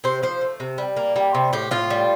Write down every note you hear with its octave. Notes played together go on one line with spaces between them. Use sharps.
C3 C5
F3 C5
A3
C3
G3
A#3
G3
C3
A2 G4
A2 F4
G3